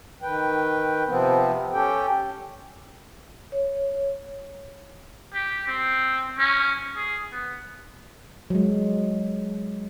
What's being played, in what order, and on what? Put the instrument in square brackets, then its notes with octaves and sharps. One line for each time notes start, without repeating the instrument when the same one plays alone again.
[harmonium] D#3 B4 G5
C3 F3 B3 C4
C#4 G4 A4 G5
[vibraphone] C#5
[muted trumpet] G4
C4
C#4
G#4
B3
[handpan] F#3 G#3